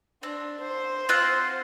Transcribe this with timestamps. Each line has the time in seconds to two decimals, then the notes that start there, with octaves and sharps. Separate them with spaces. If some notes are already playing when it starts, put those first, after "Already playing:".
0.23 C4 D4
0.61 C5
1.09 C4 F4 F#5